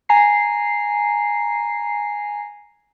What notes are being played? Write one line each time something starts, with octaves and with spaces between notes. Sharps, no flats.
G#5 A#5 C7